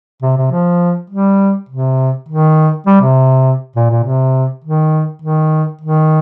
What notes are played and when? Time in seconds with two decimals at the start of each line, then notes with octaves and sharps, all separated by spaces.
0.22 C3
0.37 C3
0.51 F3
1.10 G3
1.69 C3
2.29 D#3
2.87 G3
3.01 C3
3.76 A#2
3.90 A#2
4.04 C3
4.64 D#3
5.22 D#3
5.82 D#3